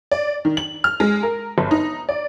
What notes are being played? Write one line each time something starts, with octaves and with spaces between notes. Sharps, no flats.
D5
D#3
F#7
F6
G#3
A#4
G1
D#4
D5